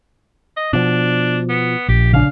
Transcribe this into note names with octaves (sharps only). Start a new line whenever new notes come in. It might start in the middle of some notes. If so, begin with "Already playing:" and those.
D#5
B2 F3 D4
B3
A#1 G4
C#3 D4 F5